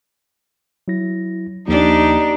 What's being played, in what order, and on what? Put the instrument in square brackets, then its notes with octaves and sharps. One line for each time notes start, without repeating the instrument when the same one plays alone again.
[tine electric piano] F#3 E4 A#6
[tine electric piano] D#2 F3 A#3 [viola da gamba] D4 G4 [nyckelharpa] D#4